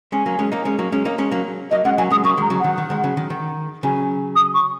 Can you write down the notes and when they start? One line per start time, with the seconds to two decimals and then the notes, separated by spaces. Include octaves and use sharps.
0.12 G#3 C#4 G#5
0.26 F#3 A#3
0.39 G#3 C#4
0.52 A#3 D#4
0.65 G#3 C#4
0.79 F#3 A#3
0.92 G#3 C#4
1.05 A#3 D#4
1.18 G#3 C#4
1.31 F#3 A#3
1.71 F#3 A#3 D#5
1.85 G#3 C#4 F#5
1.98 F#3 A#3 G#5
2.10 G#3 C#4 D#6
2.24 F#3 A#3 C#6
2.37 D#3 G#3 A#5
2.50 C#3 F#3
2.60 D#3 F#5
2.78 D#3
2.90 D#3 G#3
3.04 C#3 F#3
3.17 D#3
3.30 D#3
3.83 C#3 F#3 G#5
4.36 D#6
4.54 C#6